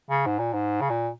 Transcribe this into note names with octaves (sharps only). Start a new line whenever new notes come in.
C#3
G#2
A#2
G#2
C#3
A#2